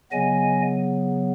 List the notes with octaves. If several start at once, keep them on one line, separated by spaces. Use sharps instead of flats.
C#3 F#3 B3 D#5 G#5